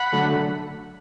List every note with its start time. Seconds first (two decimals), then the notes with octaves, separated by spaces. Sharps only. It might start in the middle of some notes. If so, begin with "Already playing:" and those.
Already playing: F#5 B5
0.12 D3 F#3 A3